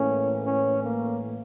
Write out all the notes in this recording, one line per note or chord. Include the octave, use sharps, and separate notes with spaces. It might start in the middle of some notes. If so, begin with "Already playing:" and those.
Already playing: A2 E3 A#3 C#4
C#4
A#3